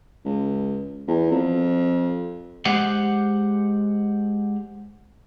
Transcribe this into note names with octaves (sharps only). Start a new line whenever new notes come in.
C#2
E2
F2
G#3 G4 C5 F#5